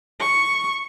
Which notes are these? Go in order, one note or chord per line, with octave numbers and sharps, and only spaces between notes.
C#6